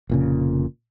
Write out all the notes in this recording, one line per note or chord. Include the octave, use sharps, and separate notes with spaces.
F1 A#2 C#3